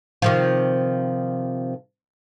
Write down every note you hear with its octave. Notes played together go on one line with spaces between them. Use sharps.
C3 D#3 F3